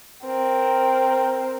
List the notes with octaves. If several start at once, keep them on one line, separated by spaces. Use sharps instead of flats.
C4 A#4